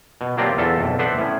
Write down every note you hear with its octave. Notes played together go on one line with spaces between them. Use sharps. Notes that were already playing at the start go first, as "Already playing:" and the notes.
B2
F#3 A#3 C4 D4 F4 G4
E2 F4 A4 E5 A5
B1 F2
B3 D4 B4 C5 E5 F#5
A2 C#4